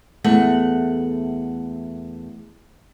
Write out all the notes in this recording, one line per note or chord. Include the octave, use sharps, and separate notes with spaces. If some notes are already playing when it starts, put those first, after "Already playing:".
E2 A3 F#5